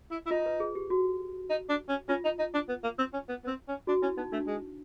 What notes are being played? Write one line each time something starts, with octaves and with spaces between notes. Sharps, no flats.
E4
E4
D#4 F4
B4
G#4
G4
F#4
D#4
D4
C#4
C#4 F4
D#4
D#4
D4
B3
A#3
C4
C#4
B3
B3
C4
C#4
D4 F#4
C#4 E4
B3 D#4
A3 D4
G#3